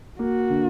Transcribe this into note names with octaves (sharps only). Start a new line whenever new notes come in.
A#3 F#4
D3